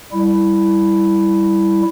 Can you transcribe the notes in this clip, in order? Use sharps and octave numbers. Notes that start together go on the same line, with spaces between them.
G3 E4